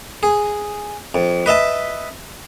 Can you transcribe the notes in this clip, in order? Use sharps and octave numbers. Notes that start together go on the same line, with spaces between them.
G#4
F2
B4 D#5 E5 A5